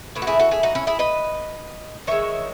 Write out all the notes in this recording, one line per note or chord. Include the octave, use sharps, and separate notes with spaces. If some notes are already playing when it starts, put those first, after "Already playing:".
A2 E3 A3
F#4
E4 G#4
F#4 A4
E4 G#4
D#4 F#4
C#4 E4
E4 G#4
B4 D#5
D#3 G#3 C#5 E5